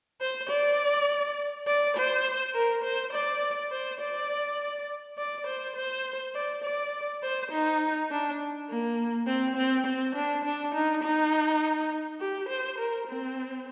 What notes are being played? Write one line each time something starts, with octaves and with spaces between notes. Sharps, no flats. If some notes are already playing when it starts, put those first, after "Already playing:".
C5
D5
D5
C5
A#4
C5
D5
C5
D5
D5
C5
C5
D5
D5
C5
D#4
D4
A#3
C4
C4
C4
D4
D4
D#4
D#4
G4
C5
A#4
C4